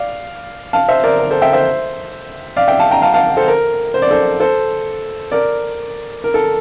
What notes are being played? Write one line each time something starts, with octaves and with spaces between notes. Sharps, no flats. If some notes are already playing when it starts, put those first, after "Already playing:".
Already playing: D5 F5
F5 A5
C5 E5
A#4 D5
A#4
A4 C5
E5 G5
C5 E5
D5 F5
E5 G5
F5 A5
G5 A#5
F5 A5
F5 A5
A4 C5
A#4
C5
D5
A4 C5
A4 C5
A#4 D5
A#4
A4